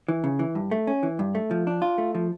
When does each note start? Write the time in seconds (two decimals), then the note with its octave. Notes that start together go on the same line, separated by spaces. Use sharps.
0.08 E3
0.24 C#3
0.39 E3
0.55 G2
0.71 A3
0.87 C#4
1.03 E3
1.19 G2
1.35 A3
1.51 F3
1.67 D4
1.82 F4
1.98 A3
2.15 F3